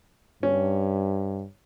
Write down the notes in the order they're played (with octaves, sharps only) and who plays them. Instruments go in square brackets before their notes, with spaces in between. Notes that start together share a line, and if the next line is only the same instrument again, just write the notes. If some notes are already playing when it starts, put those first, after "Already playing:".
[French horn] G2 [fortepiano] C#4